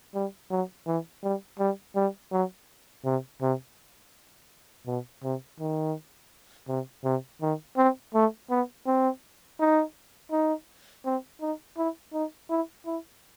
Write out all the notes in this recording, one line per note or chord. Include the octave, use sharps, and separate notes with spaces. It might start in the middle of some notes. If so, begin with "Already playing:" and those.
G3
F#3
E3
G3
G3
G3
F#3
C3
C3
B2
C3
D#3
C3
C3
D#3
C4
A3
B3
C4
D#4
D#4
C4
D#4
E4
D#4
E4
E4